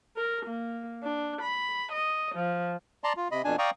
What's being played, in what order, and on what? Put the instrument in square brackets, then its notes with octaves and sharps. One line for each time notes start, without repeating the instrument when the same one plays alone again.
[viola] A#4
A#3
D4
B5
D#5
F3
[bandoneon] D5 A5 A#5 C6
F4
C3 D#5 B5
F2 B2 D4 G#5
D5 F5 G5 A#5 C#6 D#6